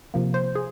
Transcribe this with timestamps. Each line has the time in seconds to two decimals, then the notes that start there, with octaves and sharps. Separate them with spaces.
0.14 C3 F3 A#3
0.34 C5
0.55 G#4